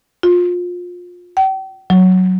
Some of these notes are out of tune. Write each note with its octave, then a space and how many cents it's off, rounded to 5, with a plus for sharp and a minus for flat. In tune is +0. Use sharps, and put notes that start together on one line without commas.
F4 +25
G5 -40
F#3 +0